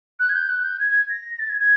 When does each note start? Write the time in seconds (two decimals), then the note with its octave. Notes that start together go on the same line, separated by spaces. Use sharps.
0.20 F#6
0.29 G#6
0.34 G6
0.49 F#6
0.64 G6
0.80 G#6
0.90 G#6
1.10 A#6
1.39 A6
1.49 G#6
1.60 G#6